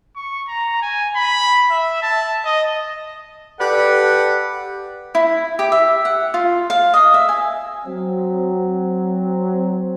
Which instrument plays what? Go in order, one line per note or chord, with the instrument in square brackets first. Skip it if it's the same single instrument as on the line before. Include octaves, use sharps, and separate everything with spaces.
[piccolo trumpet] C#6
A#5
G#5
B5
E5
A5
D#5
[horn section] G4 A4 B4 D5 F#5
[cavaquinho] E4
G4
E5
F#5
F4
F5
D#5
E5
G#5
[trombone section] F#3 C4